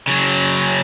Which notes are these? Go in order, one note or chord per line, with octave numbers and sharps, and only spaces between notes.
C#3 F#3